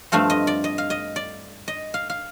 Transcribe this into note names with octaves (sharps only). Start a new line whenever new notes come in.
G2 F3 A3 C4 F5
D#5
D5
D#5
F5
D#5
D5
D#5
F5
F5